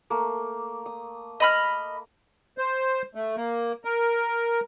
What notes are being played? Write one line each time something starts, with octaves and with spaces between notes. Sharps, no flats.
A3 A#3
D#6
D#5 B5 F6
C5
A3
A#3
A#4